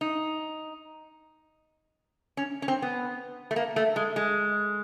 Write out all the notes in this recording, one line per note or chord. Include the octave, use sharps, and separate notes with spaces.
D#4
C#4
C#4
C4
B3
A3
A#3
A3
G#3
G#3